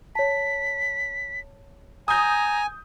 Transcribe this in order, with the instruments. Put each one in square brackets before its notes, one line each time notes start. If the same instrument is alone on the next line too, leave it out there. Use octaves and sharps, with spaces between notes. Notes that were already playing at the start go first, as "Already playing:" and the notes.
[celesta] C#5 A5 [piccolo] B6
[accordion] G#5 [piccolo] A#5 [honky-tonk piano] D#6 G6